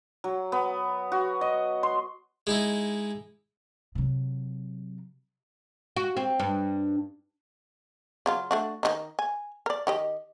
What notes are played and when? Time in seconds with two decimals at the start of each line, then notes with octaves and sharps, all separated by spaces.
0.24 F#3
0.52 B3
1.12 F#4
1.41 D#5
1.83 C6
2.47 G#3 D#4 E4
3.95 C3 F#3
5.96 F#4
6.17 C4
6.40 G2
8.26 C#3 F#3 F4
8.51 A3 D4 F#4
8.83 D#3 D4 D#4
9.19 G#5
9.66 A#4 D5
9.87 D#3 G4 D#5